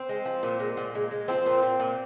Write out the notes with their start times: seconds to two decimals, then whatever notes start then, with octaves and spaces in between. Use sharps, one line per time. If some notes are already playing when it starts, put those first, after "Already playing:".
Already playing: C4
0.09 G#3
0.25 F3
0.43 A#2
0.60 G#3
0.77 A#2
0.95 G#3
1.11 G#3
1.28 F3 C4
1.46 A#2
1.63 A#2
1.80 A#2